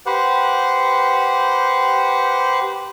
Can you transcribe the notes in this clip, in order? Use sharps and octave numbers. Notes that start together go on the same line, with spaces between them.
G4 B4 C5 F#5